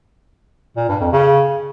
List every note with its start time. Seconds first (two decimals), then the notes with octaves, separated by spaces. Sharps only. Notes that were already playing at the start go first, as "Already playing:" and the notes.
0.77 A#2
0.89 G2
1.00 F2
1.12 C#3